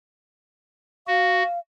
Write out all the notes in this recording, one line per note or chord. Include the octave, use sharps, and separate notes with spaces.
F#4 F5